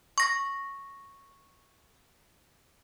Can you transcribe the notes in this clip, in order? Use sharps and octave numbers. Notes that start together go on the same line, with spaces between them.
C#6 A#6